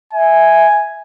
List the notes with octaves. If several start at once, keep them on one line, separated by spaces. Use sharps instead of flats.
E5 G#5